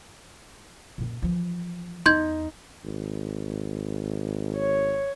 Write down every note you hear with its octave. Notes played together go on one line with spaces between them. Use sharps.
F#2 A#2
E3 F3
E2 D#4 C6 G6 G#6
G#1
C#5